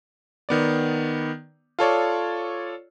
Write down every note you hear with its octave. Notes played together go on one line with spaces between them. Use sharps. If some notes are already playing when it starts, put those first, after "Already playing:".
D#3 B3 D5
F4 A4 C#5 D5